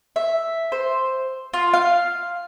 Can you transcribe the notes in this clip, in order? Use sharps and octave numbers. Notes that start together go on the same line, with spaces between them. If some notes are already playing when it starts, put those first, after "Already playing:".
E5
C5
F4
F5